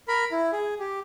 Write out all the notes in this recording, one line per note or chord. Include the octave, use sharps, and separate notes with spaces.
A#4 B5
E4
G#4
G4